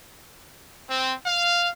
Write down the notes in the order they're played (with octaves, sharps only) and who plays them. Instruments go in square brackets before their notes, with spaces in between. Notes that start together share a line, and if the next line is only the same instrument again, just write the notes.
[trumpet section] C4
F5